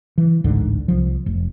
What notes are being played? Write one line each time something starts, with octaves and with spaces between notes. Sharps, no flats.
E3
A1 D2 G#2 D3
C2 F3
F1